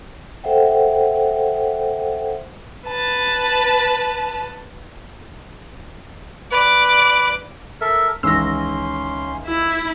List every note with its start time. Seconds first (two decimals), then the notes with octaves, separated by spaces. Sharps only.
0.44 A4 C5 E5 F#5 G5
2.87 B4 A5
6.52 B4 D5
7.81 A4 A#4 E5
8.23 C#2 D#3 E3 C#4 C6 E6 A#6
9.47 E4